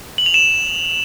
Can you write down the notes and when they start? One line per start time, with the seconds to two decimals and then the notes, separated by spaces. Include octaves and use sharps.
0.18 F#7
0.26 F7
0.34 E7